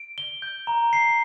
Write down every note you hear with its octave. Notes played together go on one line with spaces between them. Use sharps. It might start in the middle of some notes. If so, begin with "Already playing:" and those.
Already playing: D7
G7
G6
A#5
C7